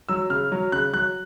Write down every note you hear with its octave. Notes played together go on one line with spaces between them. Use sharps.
F#3 E6
C#3 F6
F#3
C#3 F#6
F#3 F#6